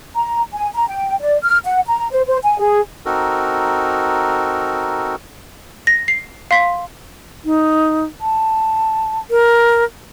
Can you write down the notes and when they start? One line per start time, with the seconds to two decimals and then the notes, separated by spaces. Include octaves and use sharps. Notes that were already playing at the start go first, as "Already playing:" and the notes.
0.15 A#5
0.53 G#5
0.74 A#5
0.88 G5
1.20 D5
1.43 F6
1.65 F#5
1.86 A#5
2.12 C5
2.27 C5
2.44 G#5
2.58 G#4
3.06 C4 D#4 F#4 A4 A#4
5.87 A#6
6.08 C7
6.51 F5 C6 B6
7.45 D#4
8.21 A5
9.31 A#4